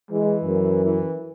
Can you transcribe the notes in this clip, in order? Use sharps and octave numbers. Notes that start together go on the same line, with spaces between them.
E3 G#3
F#2
E3